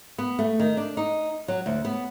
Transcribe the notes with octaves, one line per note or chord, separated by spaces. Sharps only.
B3
A3
D#3
D4
D#4
F#3
D2
B3